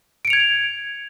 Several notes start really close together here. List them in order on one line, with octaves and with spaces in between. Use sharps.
D7 C#7 F7 G#6